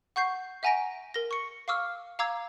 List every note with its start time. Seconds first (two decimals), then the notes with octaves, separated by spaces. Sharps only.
0.16 F#5 C#6 G6 C7
0.63 E5 F#5 G#5 A#5 A#6 D7
1.14 A#4 A#6
1.31 C#6 C#7
1.68 F5 C#6 D6 E6 F6
2.19 F5 A#5 D6 E6 G#6